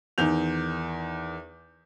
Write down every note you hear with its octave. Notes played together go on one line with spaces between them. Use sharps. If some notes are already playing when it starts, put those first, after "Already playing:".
E2 D#3 G6 F7